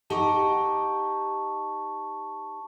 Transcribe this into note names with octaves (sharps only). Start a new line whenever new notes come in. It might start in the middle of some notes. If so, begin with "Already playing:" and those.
D#4 G4 F#5 A5 C#6